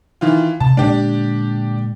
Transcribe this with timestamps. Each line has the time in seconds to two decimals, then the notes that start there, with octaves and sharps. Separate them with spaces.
0.21 D#3 E3 F4
0.60 C3 A5
0.77 A#2 D3 G#3 D4 G4